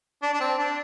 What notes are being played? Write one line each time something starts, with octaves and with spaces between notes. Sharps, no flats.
D4
D4
C4
D4